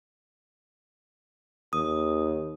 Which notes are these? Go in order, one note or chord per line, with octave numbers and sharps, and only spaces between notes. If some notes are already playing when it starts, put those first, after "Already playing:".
D#2 D#6